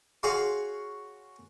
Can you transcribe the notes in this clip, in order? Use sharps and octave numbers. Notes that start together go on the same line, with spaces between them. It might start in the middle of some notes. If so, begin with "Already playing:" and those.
F#4 G#4 C#5 F5 C6